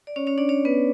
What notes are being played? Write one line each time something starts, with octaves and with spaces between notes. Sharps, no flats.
D5
C#4 C#5
C#4 C#5
D4 D5
C#4 C#5
B3 B4